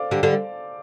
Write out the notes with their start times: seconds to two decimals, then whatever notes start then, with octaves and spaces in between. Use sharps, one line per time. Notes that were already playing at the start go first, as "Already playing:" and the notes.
Already playing: A4 C5 D5 F5 D6
0.11 D3 G3
0.23 D3 G3